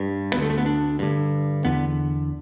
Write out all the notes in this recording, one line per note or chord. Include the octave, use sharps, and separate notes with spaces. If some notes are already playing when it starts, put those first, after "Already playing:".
Already playing: G2
D2 D3 A3 B3
A3
B3
D4
G2 D3
E2 D3 B3